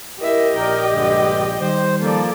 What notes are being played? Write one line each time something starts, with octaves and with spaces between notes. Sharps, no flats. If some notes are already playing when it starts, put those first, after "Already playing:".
E4 G4 A#4 D#5 E5
A#1 A#4 D5 G5
G2 D3 G#3
D#3 G3 C5
F3 A#3 A4 D5